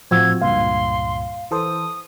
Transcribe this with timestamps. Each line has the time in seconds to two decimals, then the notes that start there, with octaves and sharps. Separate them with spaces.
0.11 A2 F3 C4 F4 F#4 E6 G#6
0.42 C#2 G2 A#2 F5 C6
1.51 E3 A4 C5 D#6